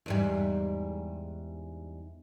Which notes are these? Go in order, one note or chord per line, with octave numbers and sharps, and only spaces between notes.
E2 G#2 G3